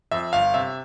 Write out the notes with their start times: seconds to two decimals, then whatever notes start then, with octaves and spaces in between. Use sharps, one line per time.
0.11 F2 E5
0.33 G1 F5
0.54 C3 E5